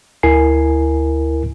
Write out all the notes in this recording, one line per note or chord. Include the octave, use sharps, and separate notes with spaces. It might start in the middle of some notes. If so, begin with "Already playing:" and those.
D2 E4 A#4 G#5 C7